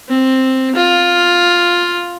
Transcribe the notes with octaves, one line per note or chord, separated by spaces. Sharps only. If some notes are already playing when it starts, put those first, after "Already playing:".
C4
F4